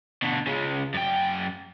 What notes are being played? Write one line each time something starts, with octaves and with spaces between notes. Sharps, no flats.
B2 D3
C#3 G#3
F#2 G5